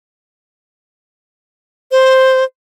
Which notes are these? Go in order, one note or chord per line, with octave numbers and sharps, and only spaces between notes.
C5